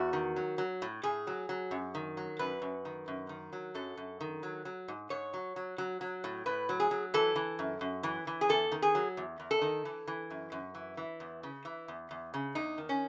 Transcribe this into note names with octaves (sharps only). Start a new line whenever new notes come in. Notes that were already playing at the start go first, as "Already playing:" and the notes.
Already playing: E2 F#4
D#3
F#3
F#3
A2
A2 G#4
F#3
F#3
F#2
D#3
F#3
F#2 B4
F#2
D#3
F#2
D#3
F#3
F#2 A4
F#2
D#3
F#3
F#3
G#2
G#2 C#5
F#3
F#3
F#3
F#3
A2
A2 B4
F#3
G#4
F#3
E3 A4
E3
F#2
F#2
E3
E3
G#4
E2 A4
D#3
G#4
F#3
E2
E2
A4
D#3
E3
E3
F#2
F#2
E3
E3
E2
C#3
E3
E2
E2
C#3
E2 D#4
D#3
C#4